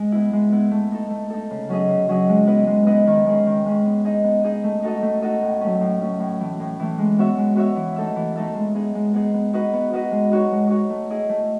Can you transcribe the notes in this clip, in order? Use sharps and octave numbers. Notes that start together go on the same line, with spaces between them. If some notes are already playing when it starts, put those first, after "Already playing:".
Already playing: G#3
B3 E4
G#3
B3 E4
A3
D#4 A4
A3
D#4 A4
C#3
F#3 C#4 G#4 D#5
C#3
F#3 C#4 G#4 D#5
G#3
B3 E4 B4 D#5
G#3
B3 E4 B4 D#5
D#3
G#3 C#4 G#4
D#3
G#3 C#4 G#4
B3
D#4 G#4 D#5
B3
D#4 G#4 D#5
A3
D#4 F#4 A4 D#5
A3
D#4 F#4 A4 D#5
A2
F#3 A3 C#4
A2
F#3 A3 C#4
A2
E3 A3
A2
E3 A3
G#3
B3 F#4 C#5 E5
G#3
B3 F#4 C#5 E5
E3
A3 D#4 A4 E5
E3
A3 D#4 A4 E5
G#3
B3 D#4 G#4
G#3
B3 D#4 G#4
B3
D#4 F#4 B4 D#5
B3
D#4 F#4 B4 D#5
G#3
D#4 F#4 C#5
G#3
D#4 F#4 C#5
A3
E4 G#4 D#5
A3